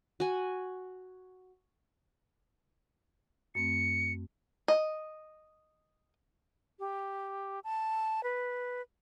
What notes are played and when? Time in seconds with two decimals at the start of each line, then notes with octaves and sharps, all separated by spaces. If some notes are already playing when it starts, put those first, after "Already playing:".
0.20 F#4 G#5
3.55 F#2 A3 C4 C#7
4.68 D#5
6.79 G4
7.64 A5
8.23 B4